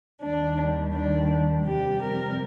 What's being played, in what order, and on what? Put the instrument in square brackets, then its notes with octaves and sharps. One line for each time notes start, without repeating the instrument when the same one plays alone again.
[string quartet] D#2 D#3 G3 D4
D4
F2 C3 G3 G4
A#4